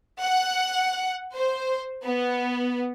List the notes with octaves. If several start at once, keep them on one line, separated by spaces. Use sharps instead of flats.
F#5
C5
B3